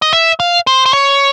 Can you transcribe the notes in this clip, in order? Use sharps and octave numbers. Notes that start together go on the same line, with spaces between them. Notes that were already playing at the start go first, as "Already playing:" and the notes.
D#5
E5
F5
C5
C5
C#5